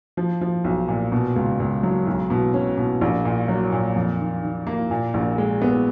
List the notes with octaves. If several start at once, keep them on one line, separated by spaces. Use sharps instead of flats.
F3
F3
B1
A#2
B2
C#2
C#2
F#3
B1
B2
C#4
B2
A#1
A#2
F#3
A#2
F2
D#3
D#3
A#3
A#2
A#1
G#3
B3